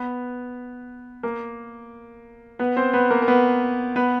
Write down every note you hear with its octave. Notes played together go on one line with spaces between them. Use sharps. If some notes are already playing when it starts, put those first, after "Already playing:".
Already playing: B3 B4
A#3 A#4
B3 B4
C4 C5
B3 B4
A#3 A#4
A#4
B3 B4
B3 B4